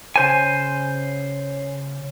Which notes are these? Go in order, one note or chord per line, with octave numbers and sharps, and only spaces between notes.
C#3 C5 G#5